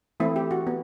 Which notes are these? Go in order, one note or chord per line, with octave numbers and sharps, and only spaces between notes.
E3 A3 C4 E4
G4
F#4
B3